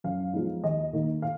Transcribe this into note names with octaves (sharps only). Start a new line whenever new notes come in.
F#2 F5
F3 G#3 B3 D#4
D#2 D#5
D#3 A#3 D#4
F5